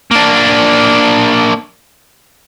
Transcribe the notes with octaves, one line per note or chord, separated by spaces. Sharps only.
A#3 D4